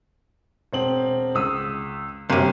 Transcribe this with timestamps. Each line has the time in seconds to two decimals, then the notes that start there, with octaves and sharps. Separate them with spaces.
0.73 E1 C4 F#7
1.35 C#2 D#6 E6
2.30 G1 F#2 C3 A#3 D#7